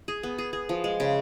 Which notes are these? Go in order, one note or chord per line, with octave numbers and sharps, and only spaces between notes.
G#4
B3
G#4
G#4
F3
G#3
C#3